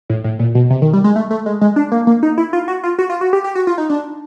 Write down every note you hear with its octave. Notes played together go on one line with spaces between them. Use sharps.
A2
A2
A#2
B2
C3
D#3
G3
G#3
A3
A3
G#3
G#3
D4
A#3
A#3
D#4
E4
F4
F#4
F4
F#4
F4
F#4
G4
G4
F#4
F4
D#4
D4